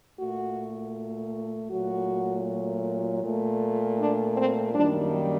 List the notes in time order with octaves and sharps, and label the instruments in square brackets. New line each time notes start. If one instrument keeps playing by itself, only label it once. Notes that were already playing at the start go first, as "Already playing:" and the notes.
[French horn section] A#2 A3 F#4
A#2 F#3 A3 F#4
A#2 A3
D4
C4
F#2 D#3 G3 A#3 D4